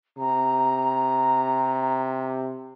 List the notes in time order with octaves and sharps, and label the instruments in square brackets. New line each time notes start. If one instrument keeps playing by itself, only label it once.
[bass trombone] C3 [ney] A#5